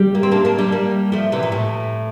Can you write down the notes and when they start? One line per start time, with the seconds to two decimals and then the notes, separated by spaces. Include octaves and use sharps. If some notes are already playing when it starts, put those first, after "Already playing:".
Already playing: G3
0.15 A#3
0.23 C4
0.32 A#3 D4
0.45 A#3 D4
0.58 G3 A#3
0.72 G3 A#3
1.12 F3 A3
1.32 C3 E3
1.43 A#2
1.52 A2